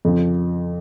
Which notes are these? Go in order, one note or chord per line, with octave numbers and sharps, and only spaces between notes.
F2 C#3 F3